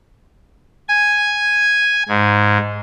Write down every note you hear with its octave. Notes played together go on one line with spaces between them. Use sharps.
G#5
G#2